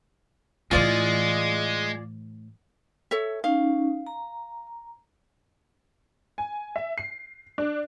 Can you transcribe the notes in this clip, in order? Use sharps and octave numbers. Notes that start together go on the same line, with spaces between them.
A2 E3 G#3 F4 D5 D#5
A4 C#5 E5
C#4 D#4 F5
A#5
G#5
E5
C7
D4